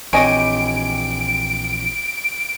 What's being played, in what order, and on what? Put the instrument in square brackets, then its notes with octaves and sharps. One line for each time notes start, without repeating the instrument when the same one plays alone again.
[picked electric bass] A#1 E3 C4 [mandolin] G4 G#5 [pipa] C#5 D#5 [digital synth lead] D7